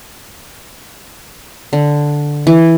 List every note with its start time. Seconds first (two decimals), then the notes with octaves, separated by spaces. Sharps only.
1.73 D3
2.47 E3